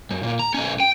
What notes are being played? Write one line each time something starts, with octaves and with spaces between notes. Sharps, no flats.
F#2
A#2
A#5
B1 C#4
G5